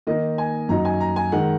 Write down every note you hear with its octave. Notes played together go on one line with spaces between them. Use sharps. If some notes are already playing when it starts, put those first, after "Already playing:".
D#3 A#3 D#4 D#5
G#5
F#2 F#3 D#4 A#5
G#5
A#5
G#5
D#3 G#3 F#5